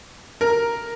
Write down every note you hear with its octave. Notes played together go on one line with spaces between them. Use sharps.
A#4